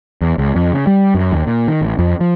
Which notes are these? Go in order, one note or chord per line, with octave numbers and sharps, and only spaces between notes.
E2
C#2
F2
C#3
G3
F#2
D#2
A#2
D#3
A1
F2
F3